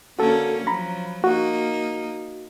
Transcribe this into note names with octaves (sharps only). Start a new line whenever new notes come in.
D3 A#3 C#4 F#4 A4
F3 F#3 A#5 B5
A#3 D#4 F#4